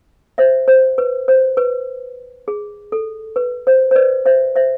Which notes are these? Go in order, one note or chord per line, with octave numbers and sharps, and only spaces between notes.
C5 E5
C5
B4
C5
B4
G#4
A4
B4
C5
C5
B4 D5
C5 E5
C5 E5